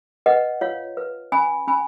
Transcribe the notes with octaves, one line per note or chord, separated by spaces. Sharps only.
B4 D#5 F#5
F4 C#5 F5
B4
C#4 G#5 B5
C#4 G#5 B5